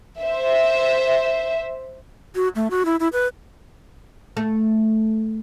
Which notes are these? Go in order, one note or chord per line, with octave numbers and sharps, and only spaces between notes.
C5 E5
F#4
A3
F#4
E4
E4
B4
A3